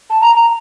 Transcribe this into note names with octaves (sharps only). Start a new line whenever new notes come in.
A5
A#5
A#5